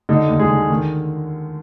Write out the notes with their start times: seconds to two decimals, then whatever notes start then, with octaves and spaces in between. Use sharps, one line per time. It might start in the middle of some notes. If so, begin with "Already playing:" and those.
0.09 D3 D#4
0.29 D#2
0.39 G#3 G#4
0.50 D3
0.70 D#3